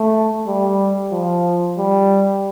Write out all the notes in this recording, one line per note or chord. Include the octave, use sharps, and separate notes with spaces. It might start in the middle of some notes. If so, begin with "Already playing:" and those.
Already playing: A3
G3
F3
G3